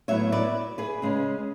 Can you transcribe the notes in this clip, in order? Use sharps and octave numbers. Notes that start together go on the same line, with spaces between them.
A2 F#3 B3 E4 C#5 E5
B4 D5
G#4 B4
C#3 G#3 C#4